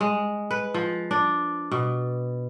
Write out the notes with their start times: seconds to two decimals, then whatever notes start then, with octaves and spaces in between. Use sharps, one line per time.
0.01 G#3
0.51 B4
0.74 F3
1.11 D4
1.71 B2